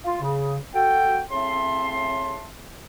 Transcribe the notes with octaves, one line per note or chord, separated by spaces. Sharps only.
F4
C#3
F#4 A4 G5
A2 C#3 C4 E5 A5 C6